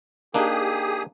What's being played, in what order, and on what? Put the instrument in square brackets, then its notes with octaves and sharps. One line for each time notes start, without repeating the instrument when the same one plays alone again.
[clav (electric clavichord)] A#3 D4 D#4 [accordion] G4 G#4 D#6